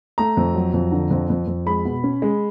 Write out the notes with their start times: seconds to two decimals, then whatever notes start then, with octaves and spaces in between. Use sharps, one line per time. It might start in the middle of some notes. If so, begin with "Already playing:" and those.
0.18 A3 A#5
0.37 F2
0.55 F#3
0.74 F2
0.92 D3
1.11 F2
1.30 F2
1.47 F2
1.66 G#3 B5
1.85 B2
2.04 C#4
2.22 G#3